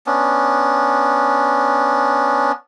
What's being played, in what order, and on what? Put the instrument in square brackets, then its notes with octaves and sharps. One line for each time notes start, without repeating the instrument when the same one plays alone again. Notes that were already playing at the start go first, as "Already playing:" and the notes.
[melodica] B3 C#4 D4